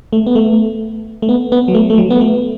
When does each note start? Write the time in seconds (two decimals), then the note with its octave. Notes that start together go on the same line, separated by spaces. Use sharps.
0.13 A3
0.26 B3
0.35 A3
1.22 A3
1.29 B3
1.52 B3
1.68 F#3
1.74 A3
1.90 A3
1.98 F#3
2.10 B3
2.21 A3